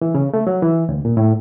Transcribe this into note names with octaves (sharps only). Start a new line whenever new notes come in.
E3
C#3
A3
F#3
E3
D2
A#2
A2